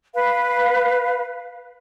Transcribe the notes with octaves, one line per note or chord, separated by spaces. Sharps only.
B4 F5